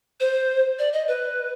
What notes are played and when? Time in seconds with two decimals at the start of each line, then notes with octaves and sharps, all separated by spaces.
0.20 C5
0.79 D5
0.93 D#5
1.08 B4